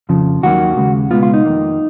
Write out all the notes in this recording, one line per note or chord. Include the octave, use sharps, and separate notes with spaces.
F2 C#3 F3
D#2 D#3 F#3 A#3 F#4
D#2 C#3 G#3
C#2 B2 G#3 B3 F4
F4
D#4
F2 D#3 A#3